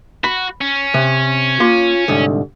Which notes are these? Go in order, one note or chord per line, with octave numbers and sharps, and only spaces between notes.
F#4 B5
C#4
C3
A#3 F4 C6
C2 G#2 D3